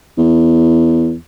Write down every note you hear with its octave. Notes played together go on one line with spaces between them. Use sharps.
E2